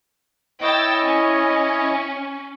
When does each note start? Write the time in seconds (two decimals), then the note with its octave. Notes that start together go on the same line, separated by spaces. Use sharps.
0.62 E4 C#5 D#5 G5 E6 A6
1.04 C#4